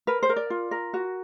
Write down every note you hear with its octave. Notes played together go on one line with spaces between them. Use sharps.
A#4 B4
C5
A#4
D5
F4
A#4
F#4